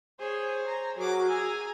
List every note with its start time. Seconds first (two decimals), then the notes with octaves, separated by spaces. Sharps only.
0.19 G#4 C5 C#5
0.67 A#5
0.97 F#3 F#4 G#4 A#4 D6
1.28 G#4 G#5 A#5 E6